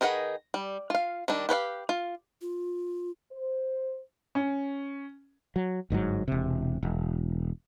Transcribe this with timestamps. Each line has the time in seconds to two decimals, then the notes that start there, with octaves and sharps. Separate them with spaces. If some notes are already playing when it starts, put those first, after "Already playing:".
0.01 D#3 D#4 G#4 B4 F#5
0.54 G3
0.90 F4 F5
1.28 D#3 G3 D4
1.49 G4 B4 C#5 F5
1.89 F4
2.41 F4
3.32 C5
4.35 C#4
5.56 F#3
5.90 G1 G#2 C#3 F#3
6.28 E1 C3
6.83 E1